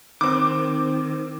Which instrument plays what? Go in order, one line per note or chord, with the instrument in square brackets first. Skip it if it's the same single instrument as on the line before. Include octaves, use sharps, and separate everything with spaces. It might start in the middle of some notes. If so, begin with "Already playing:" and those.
[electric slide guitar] D#3 [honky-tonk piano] C4 D6